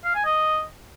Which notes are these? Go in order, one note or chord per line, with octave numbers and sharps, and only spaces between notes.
F5
G#5
D#5